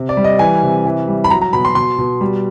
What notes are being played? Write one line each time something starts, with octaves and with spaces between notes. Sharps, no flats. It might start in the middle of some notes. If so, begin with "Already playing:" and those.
Already playing: C3
D5
G3
D#5
E3 G#5
C3
E3
G3
B5
F#3 A#5
A#5
B2 B5
C6
B2 C6
B2
G3